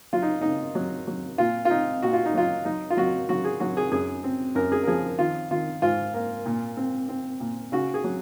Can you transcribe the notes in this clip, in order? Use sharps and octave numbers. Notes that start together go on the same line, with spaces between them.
F#3 F4
D#4
C#3 D#4
F#3
F#3
A#2 F4
F4
C4 D#4
A#2 F#4
F4
D#4
F#3 F4
F#3 D#4
F4
F#3 F#4
F#3 F#4
G#4
F#3 F#4
G#4
F#2 G#4
C4
F#2 A#4
G#4
A#4
F3 G#4
D#3 F4
D#3 F4
G#2 F4
A#3
A#2
C4
C4
A#2
C#3 F#4
G#4
F#3